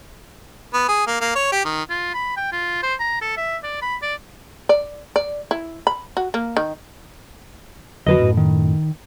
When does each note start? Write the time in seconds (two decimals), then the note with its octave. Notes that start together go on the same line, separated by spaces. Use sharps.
0.74 B3
0.88 G#4
1.07 A#3
1.21 A#3
1.35 C#5
1.52 G4
1.65 D#3
1.89 F4
2.14 B5
2.37 G5
2.52 F4
2.83 C5
3.00 A#5
3.21 A4
3.37 E5
3.64 D5
3.82 B5
4.02 D5
4.69 D5
5.16 D5
5.51 E4
5.87 B5
6.17 F#4
6.34 A#3
6.57 D#3
8.07 F2 D3 F#3 F#4 B4 D#5
8.19 F#2 A2
8.37 D#3